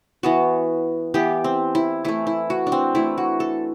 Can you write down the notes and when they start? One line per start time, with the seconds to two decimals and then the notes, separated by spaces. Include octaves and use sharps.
0.23 E3 B3 F#4
1.14 E3 B3 G4
1.44 C4
1.75 E4
2.05 E3 A3 E4
2.27 E4
2.50 F#4
2.67 D4
2.72 C4
2.95 E3 A3 E4
3.18 F#4
3.40 A4